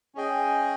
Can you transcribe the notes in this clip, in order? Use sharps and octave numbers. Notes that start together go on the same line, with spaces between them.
C#4 G#4 D#5 G5